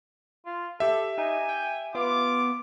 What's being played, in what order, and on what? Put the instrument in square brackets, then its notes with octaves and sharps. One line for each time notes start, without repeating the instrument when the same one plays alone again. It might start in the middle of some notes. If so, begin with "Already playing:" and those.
[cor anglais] F4
[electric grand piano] G4 E5 [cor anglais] A4
[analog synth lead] D#4 [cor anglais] G#5
[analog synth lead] G5
[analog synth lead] B3 [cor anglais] F4 [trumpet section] D6